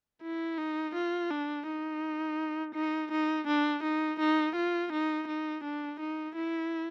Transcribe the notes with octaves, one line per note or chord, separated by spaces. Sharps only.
E4
D#4
F4
D4
D#4
D#4
D#4
D4
D#4
D#4
F4
D#4
D#4
D4
D#4
E4